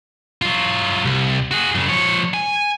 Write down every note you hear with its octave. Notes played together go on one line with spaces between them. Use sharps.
F#3 F4
C2
F#4 G#4
F#2 C#3
F3 C#5
G#5